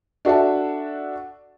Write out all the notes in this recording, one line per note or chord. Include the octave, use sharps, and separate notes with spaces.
D4 F#4 A4 E5 A5